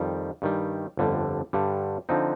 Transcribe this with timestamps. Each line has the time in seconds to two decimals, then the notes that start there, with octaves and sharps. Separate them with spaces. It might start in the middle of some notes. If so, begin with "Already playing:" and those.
Already playing: F2 D#3 G3
0.42 G2 D#3 G3
0.97 G1 F2 D3 G3
1.53 G2 D3 G3
2.09 D3 F3 C4 D#4